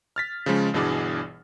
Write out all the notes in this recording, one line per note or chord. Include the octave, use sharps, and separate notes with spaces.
F6 A6 B6
C#3 F3 G#3 C#4
G1 B2 E3 D4 G#4 D5